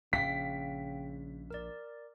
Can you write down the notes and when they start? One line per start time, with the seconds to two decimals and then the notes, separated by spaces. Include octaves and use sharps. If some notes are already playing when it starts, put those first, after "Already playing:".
0.13 A#1 C#3 F5 G5 B6
1.51 A#4 D5